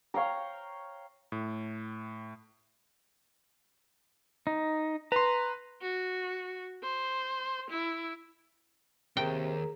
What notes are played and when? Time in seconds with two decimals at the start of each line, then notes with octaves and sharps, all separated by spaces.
0.14 C#5 F5 G5 A#5
1.32 A2
4.47 D#4
5.12 B4 A#5 C6
5.82 F#4
6.83 C5
7.70 E4
9.17 D#2 C3 G#4 A#4 G5 A#5